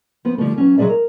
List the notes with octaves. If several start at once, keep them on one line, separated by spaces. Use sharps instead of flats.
F3 B3
D3 F3 G3 A3
E3 F#3 C#4
F#3 G#3 A3 G#4 D5 E5
A#4